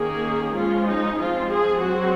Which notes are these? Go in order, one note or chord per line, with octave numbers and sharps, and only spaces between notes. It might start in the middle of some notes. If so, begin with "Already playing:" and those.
Already playing: D#3 A#3 C#4 G#4
F3 G#3 C#4 F4
D#4
F3 G#3 C4 F4
G#4
F#3 C4 F#4